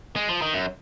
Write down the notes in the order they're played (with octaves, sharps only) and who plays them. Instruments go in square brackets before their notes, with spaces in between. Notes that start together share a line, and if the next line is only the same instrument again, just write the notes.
[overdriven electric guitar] G#3
F3
D#3
F#2